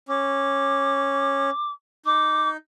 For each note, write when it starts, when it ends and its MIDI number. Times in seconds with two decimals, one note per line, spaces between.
0.09 1.50 61
0.09 1.71 86
2.06 2.57 63
2.06 2.49 86